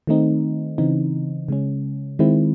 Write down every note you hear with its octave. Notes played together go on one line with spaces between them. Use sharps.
D#3 A3 C4 D#4
C#3 E3 C4 D#4
C#3 G#3 C#4
D#3 G#3 C4 E4